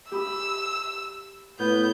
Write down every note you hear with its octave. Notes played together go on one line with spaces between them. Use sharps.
G4 B5 D#6 E6
A2 B3 G6